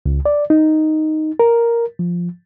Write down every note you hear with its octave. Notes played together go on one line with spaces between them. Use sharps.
C#2
D5
D#4
A#4
F3